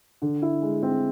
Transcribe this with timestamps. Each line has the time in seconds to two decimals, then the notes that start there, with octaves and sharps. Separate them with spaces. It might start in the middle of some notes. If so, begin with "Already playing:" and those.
0.22 D3
0.42 E4
0.62 G#3
0.83 C4